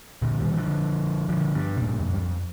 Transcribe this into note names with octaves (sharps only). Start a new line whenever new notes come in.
A#2 D3
D#3 G3
D#3
D3 F3
D3 F3
G2
C3
G2 A#2
F2
G2
F2